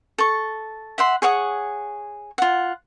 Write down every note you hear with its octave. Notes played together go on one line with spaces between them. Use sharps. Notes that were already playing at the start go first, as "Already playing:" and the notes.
A4 C#6
E5 F#5 C6
G#4 C#5 F#5 D#6
F4 F#5